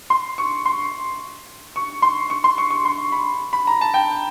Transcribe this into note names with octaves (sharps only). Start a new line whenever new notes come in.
C6
C#6
C6
C#6
C6
C#6
C6
C#6
C#6
C6
B5
B5
A#5
A5
G5